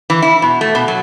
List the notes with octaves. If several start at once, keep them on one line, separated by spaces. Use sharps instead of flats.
E3
E4
B2
A3
B2
F#3